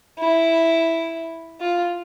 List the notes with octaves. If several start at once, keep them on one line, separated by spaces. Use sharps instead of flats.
E4
F4